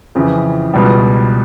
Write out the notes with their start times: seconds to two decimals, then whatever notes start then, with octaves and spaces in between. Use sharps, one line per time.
0.15 F2 C#3 E3
0.74 C#2 B2 G3